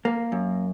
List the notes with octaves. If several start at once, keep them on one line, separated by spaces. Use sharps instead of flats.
A#3
F#2